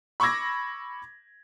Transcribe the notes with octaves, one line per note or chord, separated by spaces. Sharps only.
B5 C#6 D6 E6 G#6 A#6